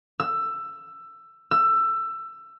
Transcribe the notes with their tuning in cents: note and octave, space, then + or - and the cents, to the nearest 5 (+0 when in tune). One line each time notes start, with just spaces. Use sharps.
E6 +15
E6 +20